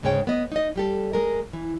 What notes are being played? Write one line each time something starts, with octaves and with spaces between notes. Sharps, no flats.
D2 G#2 C#3 G#3 C#5 G5
B3 D#5
D#4 D#5
G3 G4 A4
G#3 A#4
E3